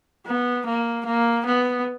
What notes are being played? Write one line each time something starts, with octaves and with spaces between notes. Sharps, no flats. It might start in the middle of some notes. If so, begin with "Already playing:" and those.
B3
A#3
A#3
B3